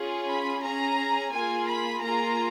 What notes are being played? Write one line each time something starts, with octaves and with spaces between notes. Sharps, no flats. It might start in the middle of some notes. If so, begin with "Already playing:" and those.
Already playing: C#4 F4 G#4
B5
C#4 G#4 A#5
A#3 F4 G#4 G#5
B5
A#3 F4 G#4 A#5